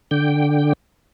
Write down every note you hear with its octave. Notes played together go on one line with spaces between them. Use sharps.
D3 G5